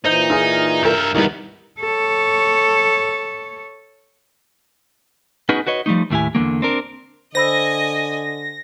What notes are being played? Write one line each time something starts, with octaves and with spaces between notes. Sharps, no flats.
A#2 E3 D#4 C5 D#5 G6
F4 G#4 G#5 D#6
G2 A#4 E5 G6
D2 E3 G3 B3 D#4 E4 A#4
A4 C#5
B3 C#4 D#4 F#4 G#4 B4
F#4 B4 C#5 D#5
F3 G3 A3 D#4
D#2 A2 E4 G4 G#5
E2 D3 F#3 A#3
C4 D4 A#4
D3 C5 D#5 G#5 B5 E6 A#6